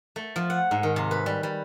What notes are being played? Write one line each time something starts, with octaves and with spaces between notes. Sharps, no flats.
A3
F3
F#5
G#2
D#3
C3
B4
G3
G3